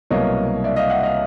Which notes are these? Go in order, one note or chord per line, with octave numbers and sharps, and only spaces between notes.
C2 B2 F#3 A#3 C#5 D#5
D5 E5
D#5 F5
E5 F#5
D#5 F5